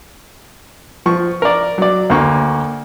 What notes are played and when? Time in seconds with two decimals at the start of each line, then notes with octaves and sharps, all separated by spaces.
1.06 F3 C#6
1.42 A#4 D5
1.78 F#3 D5
2.10 D2 A#3 C#6